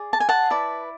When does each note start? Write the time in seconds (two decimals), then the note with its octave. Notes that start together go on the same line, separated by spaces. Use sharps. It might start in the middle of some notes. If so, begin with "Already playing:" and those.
Already playing: G#4 D5
0.13 A5
0.20 G#5
0.29 F#5 A5
0.50 E4 B4 D5